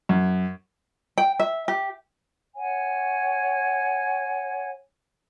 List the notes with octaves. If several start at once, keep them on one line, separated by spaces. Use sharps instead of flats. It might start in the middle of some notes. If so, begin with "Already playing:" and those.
F#2
G5
E5
G4
C#5 F#5 G#5